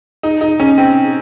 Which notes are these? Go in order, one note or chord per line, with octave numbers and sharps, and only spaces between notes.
D#4
D#4
C#4
C4